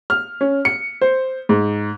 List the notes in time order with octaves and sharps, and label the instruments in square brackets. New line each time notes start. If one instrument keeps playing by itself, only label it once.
[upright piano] F6
C#4
C#7
C5
G#2